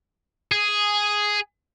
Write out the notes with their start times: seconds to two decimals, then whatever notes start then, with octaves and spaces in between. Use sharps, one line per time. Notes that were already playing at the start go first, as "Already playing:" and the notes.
0.52 G#4